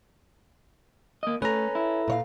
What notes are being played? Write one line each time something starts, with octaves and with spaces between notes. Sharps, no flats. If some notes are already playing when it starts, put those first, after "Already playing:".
A#3 D#5
A3 C#4 A4 B4 A#5
E4
A#2 C#5 F5